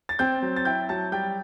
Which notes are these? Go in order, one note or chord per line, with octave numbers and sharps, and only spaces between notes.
A6
C4 G5 G6
F#3
A6
E4 G5 G6
F#3 A5 A6
G3 G5 G6